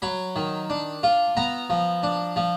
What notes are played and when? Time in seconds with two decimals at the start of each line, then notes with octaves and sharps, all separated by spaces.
0.02 F#3 B5
0.36 D#3
0.70 D4
1.03 F4
1.37 B3 A#5
1.70 F3
2.03 D4
2.36 F3